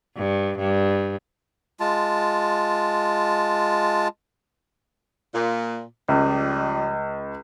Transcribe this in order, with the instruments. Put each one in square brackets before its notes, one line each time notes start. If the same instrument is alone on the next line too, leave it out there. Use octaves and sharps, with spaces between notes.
[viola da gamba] G2
G2
[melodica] G#3 F4 A5
[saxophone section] A#2
[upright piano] C#2 [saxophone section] F3 G3 D#5